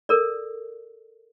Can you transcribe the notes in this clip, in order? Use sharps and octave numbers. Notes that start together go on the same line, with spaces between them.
A4 A#4 D5